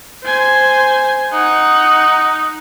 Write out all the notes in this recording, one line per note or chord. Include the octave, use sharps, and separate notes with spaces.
C5 G#5
D#4 F#5